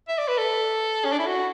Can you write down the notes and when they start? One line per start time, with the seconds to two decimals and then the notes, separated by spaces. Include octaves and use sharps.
0.08 E5
0.18 D5
0.28 B4
0.38 A4
1.05 C#4
1.12 D4
1.19 E4
1.27 F#4